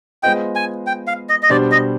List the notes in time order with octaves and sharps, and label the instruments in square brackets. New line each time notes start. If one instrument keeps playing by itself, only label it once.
[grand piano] G#3 B3 F4 C5 D#5 [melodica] G5
[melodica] G#5
G5
F5
D#5
D#5
[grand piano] B2 G3 D4 G4 C5 [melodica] D5
[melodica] D#5